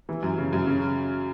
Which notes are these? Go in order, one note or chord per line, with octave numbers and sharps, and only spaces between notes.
E3
F#2
C#3
F#2
C#3